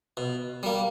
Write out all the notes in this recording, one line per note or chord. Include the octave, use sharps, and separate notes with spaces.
B2
G3 A#3